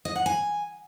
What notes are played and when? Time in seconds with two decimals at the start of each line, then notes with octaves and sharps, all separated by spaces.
0.05 D#5
0.16 F#5
0.26 G#5